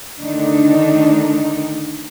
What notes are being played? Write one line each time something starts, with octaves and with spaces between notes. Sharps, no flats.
D3 D#3 A3 D4 D#4